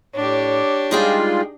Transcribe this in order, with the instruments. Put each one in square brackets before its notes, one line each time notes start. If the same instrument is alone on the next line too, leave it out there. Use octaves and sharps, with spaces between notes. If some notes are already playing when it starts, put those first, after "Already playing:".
[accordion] A2 [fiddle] D4 G4 [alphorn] C#5
[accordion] G3 G#3 F4 [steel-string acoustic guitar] D#4 G#4 G5